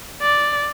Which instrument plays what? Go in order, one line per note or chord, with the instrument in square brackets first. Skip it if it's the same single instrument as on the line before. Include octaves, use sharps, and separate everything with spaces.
[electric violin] D5